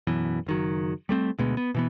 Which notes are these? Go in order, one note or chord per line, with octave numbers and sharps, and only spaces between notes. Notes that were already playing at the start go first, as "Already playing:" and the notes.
F#2 B2 E3
F#1 D#3 F#3
G3 A3 C4
D2 B2 G#3 B3
B3
B2 E3 B3